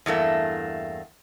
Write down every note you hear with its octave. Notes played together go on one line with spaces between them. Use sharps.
E2 G2 A3 A#3